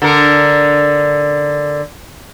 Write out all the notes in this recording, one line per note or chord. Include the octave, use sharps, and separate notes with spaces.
D3 A#4